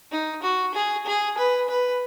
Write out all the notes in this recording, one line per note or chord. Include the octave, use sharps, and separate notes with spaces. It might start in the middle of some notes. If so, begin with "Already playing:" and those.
D#4
F#4
G#4
G#4
B4
B4